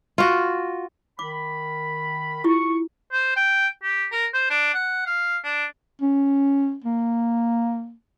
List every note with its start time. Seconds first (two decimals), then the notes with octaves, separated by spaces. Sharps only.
0.18 F4 F#4
1.19 D#3 B5 D6
2.44 E4 F4 G4 C#6
3.12 C5
3.36 G5
3.83 G4
4.12 A#4
4.34 C5
4.50 D4
4.74 F#5
5.06 F5
5.44 D4
6.02 C#4
6.84 A#3